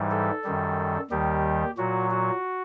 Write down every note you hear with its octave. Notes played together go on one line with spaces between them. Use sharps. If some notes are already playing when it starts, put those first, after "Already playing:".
Already playing: G#2 E3 G3
A4
F#2 D#3 G3
D#2 D#3 G3 G4
A#2 F#3 F#4
F#4